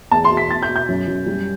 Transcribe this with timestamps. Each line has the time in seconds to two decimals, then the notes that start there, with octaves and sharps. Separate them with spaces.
0.11 E2 A5
0.25 C6
0.30 B2
0.37 B6
0.49 B2 A6
0.63 G6
0.69 B2
0.76 G6
0.88 F#2
1.07 F#2
1.26 G3